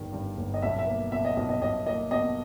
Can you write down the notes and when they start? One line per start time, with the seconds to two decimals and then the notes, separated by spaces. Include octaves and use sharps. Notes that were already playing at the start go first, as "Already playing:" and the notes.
Already playing: G1 G2 D#3 G3
0.12 G2
0.38 G1
0.54 D#5
0.62 B1 E5
0.79 E5
0.87 A#3
1.12 B2 E5
1.25 D#5
1.37 B1 D#5
1.49 D#5
1.61 B1 D#5
1.87 A#3 D#5
2.11 B2 D#5